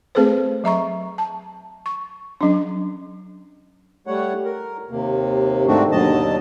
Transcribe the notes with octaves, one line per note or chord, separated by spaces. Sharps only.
A3 C4 G#4 A4 B4 C5
F#3 E5 A#5 C#6
A5
C#6
F#3 C#4 D4
G3 A3 C#5 F#5
A#4
D#2 C3 A#3
G#2 D#3 A3 C4 D4 F#4
D#2 B2 D3 F#3 D#5 A5